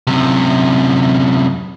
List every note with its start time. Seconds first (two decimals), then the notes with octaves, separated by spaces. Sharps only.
0.07 F#2 C3